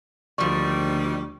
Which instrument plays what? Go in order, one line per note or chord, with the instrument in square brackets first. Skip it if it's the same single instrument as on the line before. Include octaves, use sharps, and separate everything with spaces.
[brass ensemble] D2 [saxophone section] A#2 D#3 G3 [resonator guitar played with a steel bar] F3 D5 [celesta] C#6